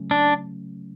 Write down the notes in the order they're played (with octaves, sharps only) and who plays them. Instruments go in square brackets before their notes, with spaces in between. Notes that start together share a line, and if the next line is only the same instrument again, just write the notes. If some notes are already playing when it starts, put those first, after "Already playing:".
Already playing: [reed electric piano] C#3 F#3 A3 C#4
[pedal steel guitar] D4